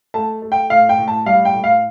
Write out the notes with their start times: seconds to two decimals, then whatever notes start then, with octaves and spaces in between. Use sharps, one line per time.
0.14 A3 A5
0.42 A3
0.52 G5
0.70 A2 F5
0.89 G5
0.98 A2
1.08 A5
1.26 G3 F5
1.45 G5
1.55 A2
1.64 F5